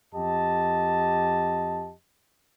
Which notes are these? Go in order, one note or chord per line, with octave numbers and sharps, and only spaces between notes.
F2 G4 D#5 A5